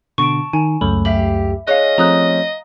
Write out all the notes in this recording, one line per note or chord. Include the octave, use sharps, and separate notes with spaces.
B2 D3 A5 C#6 D7
D#3 G#5
C#2 F#2 A3 B5
G4 E5 F5 F#7
G#3 C#4 D#5 F5 F#6
F3 A3 C4 A#5 D#6 F#6